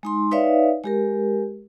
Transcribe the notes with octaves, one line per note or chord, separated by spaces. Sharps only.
G#3 D#4 C6
D#4 B4 C#5 D5 E5 F5
G#3 G4 A#4